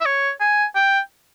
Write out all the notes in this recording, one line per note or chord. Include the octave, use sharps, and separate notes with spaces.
E5
C#5
G#5
G5